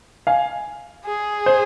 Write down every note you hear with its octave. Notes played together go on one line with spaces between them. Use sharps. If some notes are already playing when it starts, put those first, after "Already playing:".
F5 G#5
G#4
C5